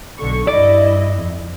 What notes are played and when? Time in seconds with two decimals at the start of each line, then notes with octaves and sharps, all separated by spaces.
0.18 B1 D3 C#6
0.47 G2 E4 D5 D#5
1.18 F2